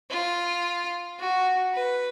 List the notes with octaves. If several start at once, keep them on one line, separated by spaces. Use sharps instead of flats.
F4
F#4
B4